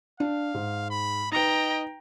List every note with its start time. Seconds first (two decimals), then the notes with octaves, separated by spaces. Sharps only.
0.20 D4 F5
0.54 G#2
0.90 B5
1.32 D#4 B4 D#5 G5 A#5